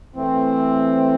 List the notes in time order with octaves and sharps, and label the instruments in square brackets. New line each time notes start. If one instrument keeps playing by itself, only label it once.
[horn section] E3 A3 C4